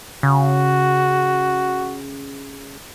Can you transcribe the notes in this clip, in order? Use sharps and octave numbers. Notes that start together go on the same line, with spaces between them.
C#3 F#4